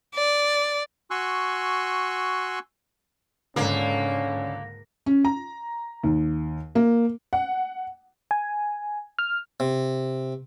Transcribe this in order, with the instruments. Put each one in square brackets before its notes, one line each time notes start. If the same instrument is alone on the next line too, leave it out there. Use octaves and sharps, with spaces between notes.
[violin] D5
[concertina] F#4 G#5 C6 C#6 E6 F#6
[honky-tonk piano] C#2 D3 [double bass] G#2 [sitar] A#3 [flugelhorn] C#4
[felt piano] C#4
A#5
D#2
A#3
[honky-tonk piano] F#5
[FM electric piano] G#5
F6
[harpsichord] C3